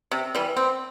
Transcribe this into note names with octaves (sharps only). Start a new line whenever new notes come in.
C3
E3 G3
C4